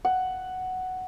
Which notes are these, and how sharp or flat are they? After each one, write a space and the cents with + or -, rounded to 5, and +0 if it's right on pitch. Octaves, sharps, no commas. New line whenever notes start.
F#5 +5